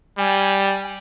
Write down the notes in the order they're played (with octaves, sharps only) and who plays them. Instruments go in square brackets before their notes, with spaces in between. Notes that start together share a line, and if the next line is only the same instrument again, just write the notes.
[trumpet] G3 [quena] G#5